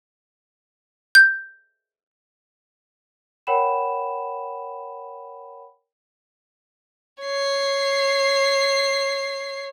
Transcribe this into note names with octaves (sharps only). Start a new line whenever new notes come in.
G6
A#4 C#5 F#5 G5 B5 E7
C#5 C7